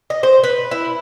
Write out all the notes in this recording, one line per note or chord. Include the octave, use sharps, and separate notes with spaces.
D#5
C5
B4
E4